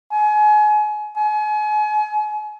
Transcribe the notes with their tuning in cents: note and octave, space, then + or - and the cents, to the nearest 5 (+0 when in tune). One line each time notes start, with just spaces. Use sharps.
G#5 +30
G#5 +35